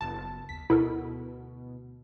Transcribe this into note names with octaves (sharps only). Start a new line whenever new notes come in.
F#1 B3 A5
D#2 B6
D2 B2 E4 A4 A#4